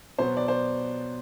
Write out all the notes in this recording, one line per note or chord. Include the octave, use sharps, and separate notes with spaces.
B2 F#3 B3 C5
D5
C5